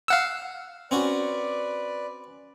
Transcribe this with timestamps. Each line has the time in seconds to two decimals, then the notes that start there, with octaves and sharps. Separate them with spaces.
0.08 F5 F#5 E6
0.91 C4 C#4 F#4 B4 D5